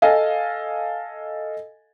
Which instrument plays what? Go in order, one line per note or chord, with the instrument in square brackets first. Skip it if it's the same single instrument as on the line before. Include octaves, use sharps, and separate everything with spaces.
[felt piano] A4 D#5 F5 G#5